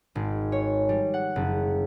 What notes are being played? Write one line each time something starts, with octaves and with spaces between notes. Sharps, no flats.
G#1
C#5
G3
F#5
F#1